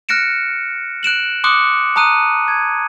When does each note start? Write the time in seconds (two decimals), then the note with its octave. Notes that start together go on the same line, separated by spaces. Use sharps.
0.09 F6 F#6 A#6 C#7 D7 E7
1.03 F#6 D7 E7 F#7
1.44 C6 D6 D#6 F#6 C#7
1.96 A5 A#5 D#6 F#6 D#7
2.48 G#6